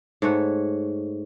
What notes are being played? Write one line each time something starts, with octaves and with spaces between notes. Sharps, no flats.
G#2 A3 C#5 F#5